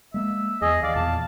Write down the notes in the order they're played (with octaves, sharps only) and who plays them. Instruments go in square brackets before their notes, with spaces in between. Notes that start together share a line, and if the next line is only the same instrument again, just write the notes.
[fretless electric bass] G#3 A#3 [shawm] E5
[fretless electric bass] E2 [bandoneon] G#4 D#5
[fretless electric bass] D#2 [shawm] D5 [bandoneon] F5
[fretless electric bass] E2 A#2 [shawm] A5